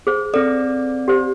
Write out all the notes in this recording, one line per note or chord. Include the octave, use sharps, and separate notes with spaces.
G#4 C5
C4 A4 D5
G4 C5